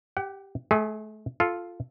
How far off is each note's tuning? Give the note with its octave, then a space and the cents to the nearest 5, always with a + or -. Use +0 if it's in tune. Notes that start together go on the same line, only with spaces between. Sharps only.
G4 +0 F#5 +35
A3 -35 G#4 +0
F4 +0 A4 -10